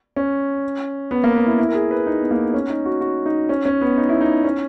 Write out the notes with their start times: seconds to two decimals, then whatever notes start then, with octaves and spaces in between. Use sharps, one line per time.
0.16 C#4
1.11 B3
1.24 A#3
1.35 B3
1.47 E4
1.59 E4
1.69 A#4
1.75 G#4
1.91 B4
2.07 D#4
2.19 B3
2.31 A#3
2.42 B3
2.54 C#4
2.70 D#4
2.86 F#4
3.01 F#4
3.26 D#4
3.49 C#4
3.65 C#4
3.81 B3
3.97 D#4
4.09 E4
4.21 D#4
4.44 C#4